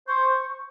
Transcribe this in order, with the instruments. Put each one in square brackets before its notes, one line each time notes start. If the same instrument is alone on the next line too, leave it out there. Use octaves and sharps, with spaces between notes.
[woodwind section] C5 [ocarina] C#6